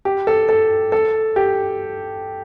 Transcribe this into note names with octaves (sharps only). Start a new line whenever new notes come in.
G4
A4
A4
A4
G4